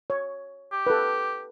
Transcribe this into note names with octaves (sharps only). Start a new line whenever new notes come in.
C#5
G4
A4 B4